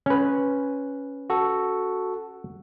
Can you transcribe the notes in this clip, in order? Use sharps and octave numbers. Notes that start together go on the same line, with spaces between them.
C#4 B4
F#4 A4